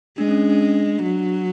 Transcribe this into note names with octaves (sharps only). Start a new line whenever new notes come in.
G#3 D4
C#4
C#4
D4
D4
F#3